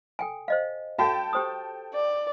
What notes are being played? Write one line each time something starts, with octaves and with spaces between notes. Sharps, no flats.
A4 G5 G#5
C5 D#5 F5
F#4 A4 F5 G5 A5
G4 C5 D#6
D5